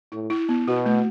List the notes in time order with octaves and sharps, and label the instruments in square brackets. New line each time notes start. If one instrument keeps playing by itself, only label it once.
[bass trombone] A2 [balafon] E4
[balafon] E4
B3
[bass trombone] B2 [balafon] F#4
[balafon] A3